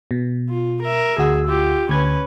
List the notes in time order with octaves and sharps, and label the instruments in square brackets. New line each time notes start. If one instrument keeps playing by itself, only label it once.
[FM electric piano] B2
[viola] F4
A#4 E5
[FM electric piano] D2 F#4 E6 [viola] G#4
[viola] F4 G4
[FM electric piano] D2 G#6 [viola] C#4 B4